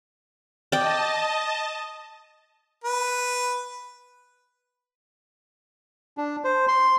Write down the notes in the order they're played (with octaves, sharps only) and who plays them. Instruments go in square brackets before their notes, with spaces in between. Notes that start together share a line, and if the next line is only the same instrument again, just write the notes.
[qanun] D5 G5 [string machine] D#5 A5
[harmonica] B4
[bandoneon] D4
C5
C6